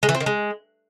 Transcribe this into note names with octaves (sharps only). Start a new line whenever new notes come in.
G#3
E3
C4
D#3
G#3